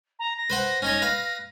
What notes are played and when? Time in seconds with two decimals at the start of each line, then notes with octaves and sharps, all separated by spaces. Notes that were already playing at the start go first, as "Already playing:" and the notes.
0.19 A#5
0.37 A#6
0.50 B4 C5 F#5
0.82 C#4 D#4 C#5
1.02 B4 F5